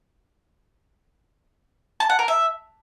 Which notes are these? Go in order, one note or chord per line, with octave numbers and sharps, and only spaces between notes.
A5
F#5
A#4
E5